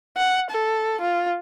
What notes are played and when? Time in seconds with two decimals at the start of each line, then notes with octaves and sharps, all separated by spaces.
0.17 F#5
0.51 A4
1.01 F4